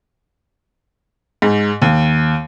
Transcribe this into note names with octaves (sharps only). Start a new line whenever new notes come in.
G#2
D#2